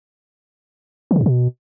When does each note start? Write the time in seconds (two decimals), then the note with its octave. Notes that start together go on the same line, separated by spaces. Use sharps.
1.11 D#3
1.16 C3
1.21 F#2
1.26 B2